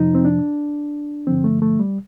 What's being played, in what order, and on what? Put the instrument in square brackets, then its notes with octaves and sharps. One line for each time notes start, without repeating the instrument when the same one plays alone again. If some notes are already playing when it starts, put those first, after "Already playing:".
Already playing: [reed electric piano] F2 C3 F3 D#4
C4
D4
G2 D3 F3 C4
A3
A3
G3